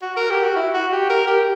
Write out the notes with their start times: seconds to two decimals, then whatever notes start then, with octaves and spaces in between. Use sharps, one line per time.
0.02 F#4
0.17 A#4
0.30 G4
0.44 F#4
0.56 E4
0.74 F#4
0.92 G4
1.10 A#4
1.28 G4